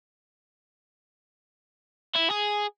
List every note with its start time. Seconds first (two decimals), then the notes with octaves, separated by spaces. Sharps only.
2.15 E4
2.30 G#4